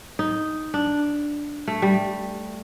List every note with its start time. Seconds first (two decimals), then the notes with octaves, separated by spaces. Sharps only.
0.19 D#4
0.74 D4
1.68 A3
1.82 G3